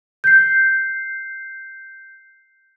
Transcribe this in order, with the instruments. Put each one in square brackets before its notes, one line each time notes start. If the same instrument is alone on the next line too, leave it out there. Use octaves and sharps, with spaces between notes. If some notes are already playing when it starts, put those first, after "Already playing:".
[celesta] G6 C7